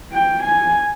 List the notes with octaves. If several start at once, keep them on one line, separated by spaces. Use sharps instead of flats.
G5
G#5